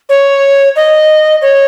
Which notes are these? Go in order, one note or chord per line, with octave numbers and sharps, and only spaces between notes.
C#5
D#5
C#5